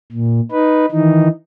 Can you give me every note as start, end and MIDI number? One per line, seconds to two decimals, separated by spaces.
0.12 0.40 46
0.51 0.86 63
0.51 0.86 71
0.91 1.28 51
0.91 1.28 52
0.91 1.28 63